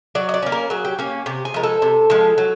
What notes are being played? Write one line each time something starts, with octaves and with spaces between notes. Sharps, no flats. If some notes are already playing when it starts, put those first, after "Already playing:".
F#3 D5
D#5
D5
A#3 C#4
A#4
F#3 G#4
G4
A#3 C#4 G4
C3 G4
G#4
F3 G#3 A#4
A4
C3
F3 G#3
F#3